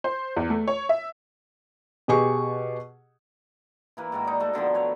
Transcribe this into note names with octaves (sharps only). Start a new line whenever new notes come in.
C5
E2
A3
C#5
E5
B2 G4 G#4 C#6
E3 A#3 B4
G#2 D#3 F#4
D#4 D5
A3 F#4
B2 D3 D#3 F3
B4 C#5